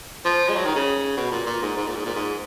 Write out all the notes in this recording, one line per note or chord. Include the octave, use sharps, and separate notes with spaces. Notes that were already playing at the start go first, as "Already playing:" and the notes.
F3
G#3
F#3
D#3
C#3
B2
A#2
A#2
G#2
G#2
A#2
G#2
A#2
G#2